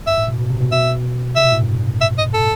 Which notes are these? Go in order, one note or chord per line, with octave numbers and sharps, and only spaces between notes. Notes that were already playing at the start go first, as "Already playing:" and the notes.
G2 E5
A2
B2
B2
C3
B2
B2 E5
C3 E5
B2
A2
G2
E5
D#5
A4